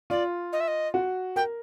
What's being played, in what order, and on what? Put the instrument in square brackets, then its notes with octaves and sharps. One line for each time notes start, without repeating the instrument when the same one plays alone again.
[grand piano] F4 [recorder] D5
[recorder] D#5
E5
D#5
[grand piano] F#4
[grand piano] A#4 [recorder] G5